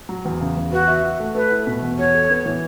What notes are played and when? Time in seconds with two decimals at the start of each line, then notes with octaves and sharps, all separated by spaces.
0.09 F#3
0.25 E2
0.41 C#3
0.57 E2
0.72 F#4 B4
0.88 E5
1.04 F#4
1.20 A3
1.35 A3 B4
1.51 E4
1.67 B2
1.82 E2
1.98 F#4 C#5
2.14 A4
2.30 B3
2.46 E3